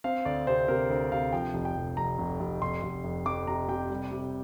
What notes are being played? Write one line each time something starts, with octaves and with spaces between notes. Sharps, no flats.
C4 F5
D2 D5
C3 C5
C3 A#4
D2 C5
C3 F5
F3 G5
F1
G5
F1
F1 A#5
F1
F1
F1 C6
F1
F2
F2 D6
C3 A#5
C3 G5
G3
C3